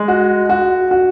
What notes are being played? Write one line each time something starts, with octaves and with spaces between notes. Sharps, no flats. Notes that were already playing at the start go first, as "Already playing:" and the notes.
Already playing: G#3
F#4
F#4
F#4